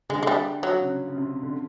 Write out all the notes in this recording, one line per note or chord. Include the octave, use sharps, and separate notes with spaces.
D3 G#3
G#3
G3
F#3
C#3
C#3
C3
D3